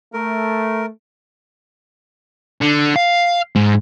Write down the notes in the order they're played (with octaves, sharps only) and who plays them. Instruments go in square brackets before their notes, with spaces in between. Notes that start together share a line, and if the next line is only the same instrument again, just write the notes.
[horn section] A3 [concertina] A#4
[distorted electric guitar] D3
F5
G#2